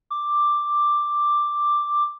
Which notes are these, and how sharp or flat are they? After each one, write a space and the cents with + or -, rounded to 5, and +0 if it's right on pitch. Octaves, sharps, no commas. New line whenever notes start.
D6 +5